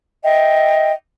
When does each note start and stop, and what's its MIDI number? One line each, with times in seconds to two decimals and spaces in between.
0.24 0.92 75
0.24 0.92 76
0.24 0.92 79